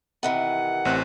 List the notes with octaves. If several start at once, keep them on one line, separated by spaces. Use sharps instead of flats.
C3 D#3 E3 F#5
A1 C4 F#6